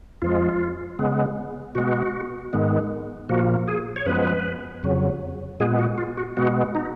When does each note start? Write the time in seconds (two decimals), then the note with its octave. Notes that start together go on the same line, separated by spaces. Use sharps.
0.22 F2 F3 G#3 F4
0.99 C#3 G#3 B3
1.75 B2 G#3 B3 F#4
2.53 G#2 D#3 G#3 B3
3.29 A#2 F3 A#3 F#4
3.68 G#4
3.96 C#5
4.06 F#2 F3 G#3 B3 B4
4.83 F2 C#3 F#3
5.60 A#2 G#3 B3 G#4
5.79 F#4
5.98 F4
6.17 F#4
6.37 B2 G#3 B3 F#4
6.75 D#4